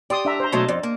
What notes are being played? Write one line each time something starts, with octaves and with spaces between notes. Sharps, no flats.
G4 D5 C6 D#6
D4 E5 A#5
C5 A#5
B2 F#3 A3 D#5 A5 C6
F2 D5
A#3